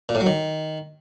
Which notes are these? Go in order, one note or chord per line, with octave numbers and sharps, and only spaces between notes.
A#2
A2
F#3
D#3